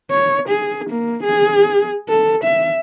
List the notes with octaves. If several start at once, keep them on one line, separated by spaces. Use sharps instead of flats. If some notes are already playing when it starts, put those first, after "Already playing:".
C#5
G#4
A#3
G#4
A4
E5